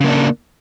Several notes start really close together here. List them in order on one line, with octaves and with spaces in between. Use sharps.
C#3 A#3 D4